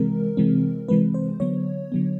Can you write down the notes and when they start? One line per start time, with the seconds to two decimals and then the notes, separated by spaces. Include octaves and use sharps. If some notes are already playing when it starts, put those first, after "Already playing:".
Already playing: C3 E3 G#3 C4 A#4
0.37 C3 E3 G#3 C4
0.88 C3 E3 G#3 C4 B4
1.14 C5
1.40 D3 F#3 B3 C#5
1.92 D3 F#3 B3